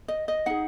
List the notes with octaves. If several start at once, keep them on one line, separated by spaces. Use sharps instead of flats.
D#5
D#5
D#4 G#4 F#5